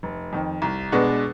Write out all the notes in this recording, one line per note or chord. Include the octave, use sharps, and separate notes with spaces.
F1
F2 D#3
C2
B2 G#3 B3 D4